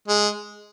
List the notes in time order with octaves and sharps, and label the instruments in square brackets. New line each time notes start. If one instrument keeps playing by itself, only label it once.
[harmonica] G#3